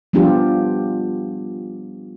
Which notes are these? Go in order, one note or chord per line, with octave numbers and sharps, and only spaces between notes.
F3 G3 B3 D4 F4 G4